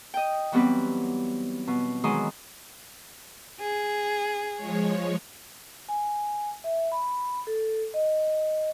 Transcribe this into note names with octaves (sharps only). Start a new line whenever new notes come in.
D#5 G5
E3 F#3 G3 B3 C4 B4
B2
D#3 E3 F#3 G#3 C6 D#6
G#4
F3 G#3 C#5
G#5
E5
B5
A4
D#5